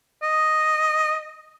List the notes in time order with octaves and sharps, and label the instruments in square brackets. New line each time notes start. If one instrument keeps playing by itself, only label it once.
[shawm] D#5